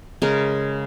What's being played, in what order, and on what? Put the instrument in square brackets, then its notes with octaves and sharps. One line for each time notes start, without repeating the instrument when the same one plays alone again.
[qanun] C#3 G#3 A#4